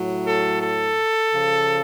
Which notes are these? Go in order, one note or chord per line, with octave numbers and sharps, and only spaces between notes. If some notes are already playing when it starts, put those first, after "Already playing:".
Already playing: A2 F#3
A4
A4
C#3 F3